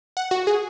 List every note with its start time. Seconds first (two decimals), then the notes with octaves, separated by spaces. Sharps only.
0.17 F#5
0.31 F#4
0.47 G#4